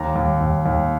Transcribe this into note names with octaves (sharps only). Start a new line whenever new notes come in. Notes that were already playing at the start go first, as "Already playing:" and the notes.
Already playing: D#2 A#5
D#2
D#2
D#2